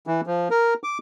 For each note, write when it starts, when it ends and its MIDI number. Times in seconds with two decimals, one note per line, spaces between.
0.07 0.21 52
0.27 0.48 53
0.51 0.74 70
0.84 0.98 86